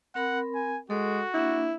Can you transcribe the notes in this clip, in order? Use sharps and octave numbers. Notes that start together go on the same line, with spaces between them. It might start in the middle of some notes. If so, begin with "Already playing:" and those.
C4 A#4 F#5 B5
G#5
G#3 F#4 A4
A#3 D4 E4